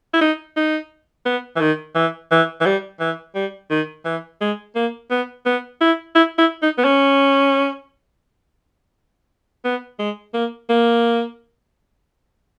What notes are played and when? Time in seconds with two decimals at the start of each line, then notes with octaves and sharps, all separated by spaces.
0.14 E4
0.21 D#4
0.57 D#4
1.26 B3
1.56 E3
1.61 D#3
1.95 E3
2.31 E3
2.61 E3
2.66 G3
3.00 E3
3.35 G3
3.71 D#3
4.05 E3
4.41 G#3
4.75 A#3
5.11 B3
5.46 B3
5.81 E4
6.15 E4
6.39 E4
6.62 D#4
6.78 B3
6.85 C#4
9.65 B3
9.99 G#3
10.34 A#3
10.70 A#3